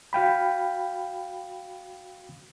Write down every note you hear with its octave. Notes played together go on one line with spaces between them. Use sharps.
F#4 F5 G5 B5